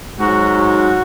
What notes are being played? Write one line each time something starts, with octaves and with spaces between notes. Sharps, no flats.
G#2 F#3 F#4
F#4